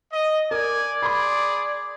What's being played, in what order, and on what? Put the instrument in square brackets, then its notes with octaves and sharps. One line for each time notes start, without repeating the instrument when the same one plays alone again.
[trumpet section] D#5
[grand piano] A#4 [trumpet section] D5 [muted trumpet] G#5
[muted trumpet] G#4 [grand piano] B5 C6